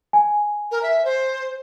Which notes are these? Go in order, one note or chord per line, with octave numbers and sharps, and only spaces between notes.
G#5
A#4
E5
C5